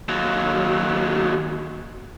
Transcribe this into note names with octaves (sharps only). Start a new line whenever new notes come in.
D#2 F#3